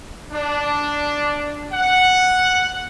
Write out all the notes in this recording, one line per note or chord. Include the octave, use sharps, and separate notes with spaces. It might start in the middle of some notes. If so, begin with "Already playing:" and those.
D4
F#5